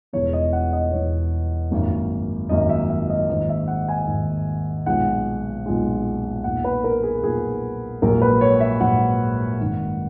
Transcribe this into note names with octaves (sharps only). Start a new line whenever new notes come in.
E1 E2 B2 C#5
D#5
F#5
D#5
E1 E2 B2 C#5
G#1 F#2 D#3 A#3
G#1 F#2 D#3 A#3 D#5
E5
E5
D#5
G#1 G#2 D#3 A#3 D#5
E5
F#5
G#5
G#1 G#2 D#3 A#3
B1 A#2 G#3 F#5
B1 A#2 G#3
B1 A#2 A#3 F#5
B4
A#4
G#4
B1 A#2 A#3 G#4
A#1 G#2 F#3 A#3 A#4
B4
C#5
E5
A#1 G#2 F#3 A#3 F#5
G#1 F#2 D#3 A#3